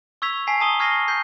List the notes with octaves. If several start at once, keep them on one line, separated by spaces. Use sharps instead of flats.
C#6 E6 G#6 B6 F7
G#5 A5 B6 C7
A5 A#5 D#6 D#7 G7
C#6 F6 G#6 A#6 C7 D#7
C7
G6 G#6 C7